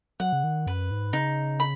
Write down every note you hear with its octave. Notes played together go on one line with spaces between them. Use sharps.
F#3 F#5
C#3
D#3
F#2 B4
G#2
C#3 D#4
B5